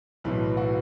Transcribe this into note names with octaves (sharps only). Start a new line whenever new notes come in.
B1 A2 E3 B3 B4
F#4